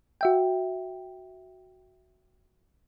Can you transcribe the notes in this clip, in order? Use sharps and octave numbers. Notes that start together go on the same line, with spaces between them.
F#4 E5 G5